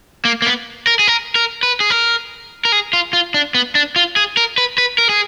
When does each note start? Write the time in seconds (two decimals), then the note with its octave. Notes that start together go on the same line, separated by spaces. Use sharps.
0.25 A#3
0.42 A#3
0.46 B3
0.87 A#4
0.99 G#4
1.08 A#4
1.35 A#4
1.63 B4
1.80 G#4
1.90 A#4
2.65 A#4
2.72 G#4
2.93 F4
3.13 F4
3.34 D4
3.55 B3
3.75 D4
3.96 F4
4.16 G#4
4.37 A#4
4.58 B4
4.78 B4
4.98 A#4
5.09 G#4